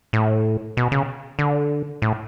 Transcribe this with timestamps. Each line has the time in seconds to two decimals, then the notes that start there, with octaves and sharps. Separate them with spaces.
0.13 A2
0.77 B2
0.92 C#3
1.39 D3
2.02 A2